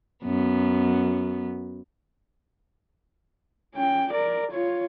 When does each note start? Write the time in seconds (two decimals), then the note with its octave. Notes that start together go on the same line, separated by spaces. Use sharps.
0.24 F#2 B3
3.74 C#4 G5
4.13 A#4 D5
4.52 F4 C#5